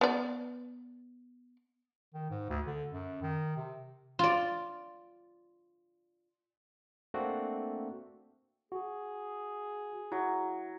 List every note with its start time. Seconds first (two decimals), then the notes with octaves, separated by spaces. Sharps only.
0.01 B3 D5
2.14 D#3
2.30 G#2
2.49 D2
2.67 D3
2.91 F#2
3.22 D#3
3.57 C3
4.19 F4 D5
7.14 A3 A#3 C4 D4 F#4
8.72 F#4 G#4
10.12 F#3 E4